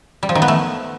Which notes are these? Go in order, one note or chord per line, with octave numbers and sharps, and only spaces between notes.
G3
F3
D#3
B3
A3